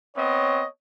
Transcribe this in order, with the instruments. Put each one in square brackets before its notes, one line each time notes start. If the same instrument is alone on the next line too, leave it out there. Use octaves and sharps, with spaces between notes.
[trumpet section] B3 C4 D#5 [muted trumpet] C#5